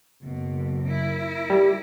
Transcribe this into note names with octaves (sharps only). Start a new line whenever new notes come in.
F#1 B2
E4 A#4
G3